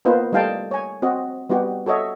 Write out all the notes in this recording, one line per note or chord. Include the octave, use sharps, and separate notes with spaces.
A#3 B3 D#4 F4 B4 C5
G3 A3 D#4 F5 G5 A5
C#5 G#5
C4 F#4 D#5
G3 B3 D#4 F#4 G4
F#4 A4 C#5 D#5 E5